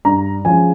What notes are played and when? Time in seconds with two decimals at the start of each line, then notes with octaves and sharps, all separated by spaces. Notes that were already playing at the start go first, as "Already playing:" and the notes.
0.05 G2 A#5
0.45 F3 G#3 C#4 G#5